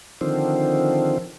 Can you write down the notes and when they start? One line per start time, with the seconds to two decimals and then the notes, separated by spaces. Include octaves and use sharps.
0.21 D3 D#3 F3 C4